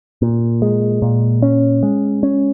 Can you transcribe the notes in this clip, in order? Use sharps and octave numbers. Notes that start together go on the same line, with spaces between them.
A#2
G#3
A#2
C#4
G#3
C#4